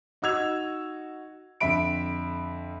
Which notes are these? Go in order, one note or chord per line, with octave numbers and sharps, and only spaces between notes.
D#4 F#4 D#5 E6 G#6 F7
F2 D3 E5 B5 D7